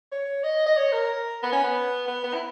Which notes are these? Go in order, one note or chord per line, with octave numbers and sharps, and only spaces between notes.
C#5
D#5
D#5
C#5
A#4
B3
C#4
B3
B3
B3
E4